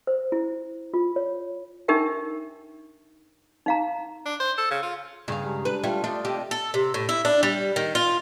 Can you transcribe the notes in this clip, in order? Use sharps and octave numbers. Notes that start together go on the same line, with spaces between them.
C5
E4
F4
C#5
D4 D#4 G4 A#4 E5 G5
D#4 F5 A#5
D4
C5
A4
C#3
F4
G2 C#3 G#4 F5
G#3 G4 A#5
D4 B4
G3 A3 F4
A3 D4 F4 G5 D6 D#6
C3 G4 D#5 E6
A4
C3
A2
E4
D4
G3
D#3
F4